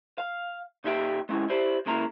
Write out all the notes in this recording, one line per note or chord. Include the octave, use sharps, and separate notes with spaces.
F5
A#2 D#4 G4 E5 G5
G#3 C#4 E4
E4 G4 C5 D5
C#2 C#3 A#3 E4 A#5